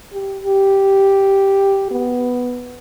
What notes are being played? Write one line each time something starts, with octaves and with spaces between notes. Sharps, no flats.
G4
G4
B3